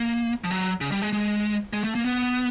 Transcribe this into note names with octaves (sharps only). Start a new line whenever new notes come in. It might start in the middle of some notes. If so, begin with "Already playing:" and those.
Already playing: A#3
F3
F#3
C#3
G3
G#3
G#3
G#3
A3
A#3
B3